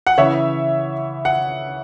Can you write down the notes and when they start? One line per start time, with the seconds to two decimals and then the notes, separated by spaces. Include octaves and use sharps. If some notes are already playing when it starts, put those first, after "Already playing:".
0.07 F#5
0.18 C#3 E3 C#5 E5
1.25 F#5